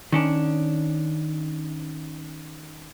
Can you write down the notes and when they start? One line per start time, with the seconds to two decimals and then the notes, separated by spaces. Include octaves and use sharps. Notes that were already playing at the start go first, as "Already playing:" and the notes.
0.12 D#3 C#4 D4